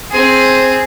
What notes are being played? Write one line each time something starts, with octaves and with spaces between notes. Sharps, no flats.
C4 G#4